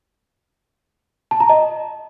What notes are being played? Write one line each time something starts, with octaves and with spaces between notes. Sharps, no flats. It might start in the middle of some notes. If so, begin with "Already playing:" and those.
A5
A#5
D#5